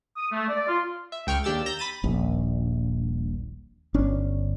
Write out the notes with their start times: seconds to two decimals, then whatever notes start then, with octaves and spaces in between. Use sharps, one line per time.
0.17 D#6
0.32 A3
0.49 D5
0.68 F4
1.12 E5
1.27 C#2 G5 C#6 F6
1.44 D#2 D4 G4 E6 A6
1.66 A#5 E6 G6 A#6
1.79 B5 A6 D#7
2.04 D#1 A#1
3.94 G1 C#4 D4